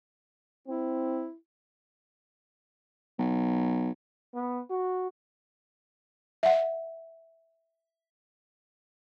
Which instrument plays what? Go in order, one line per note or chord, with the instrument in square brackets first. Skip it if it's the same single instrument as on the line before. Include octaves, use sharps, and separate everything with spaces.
[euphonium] C4 [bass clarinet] E4
[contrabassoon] B1
[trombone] B3
F#4
[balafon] E5 F#5